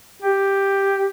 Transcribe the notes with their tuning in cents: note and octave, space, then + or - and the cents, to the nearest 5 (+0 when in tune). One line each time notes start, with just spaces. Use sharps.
G4 +5